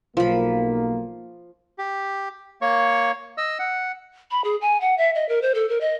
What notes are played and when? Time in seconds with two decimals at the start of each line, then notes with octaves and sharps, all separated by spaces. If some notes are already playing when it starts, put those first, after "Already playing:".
0.17 B1 F3 A#3 B5
1.78 G4
2.62 A#3 C#5 C#6
3.38 D#5 E6
3.59 F#5
4.31 B5
4.44 G#4
4.61 G#5
4.81 F#5
4.98 E5
5.15 D#5
5.29 A#4
5.42 C5
5.55 A4
5.69 A#4
5.81 D#5